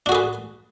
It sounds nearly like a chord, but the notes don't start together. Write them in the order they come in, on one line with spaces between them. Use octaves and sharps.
D4 F#4 G#4 B4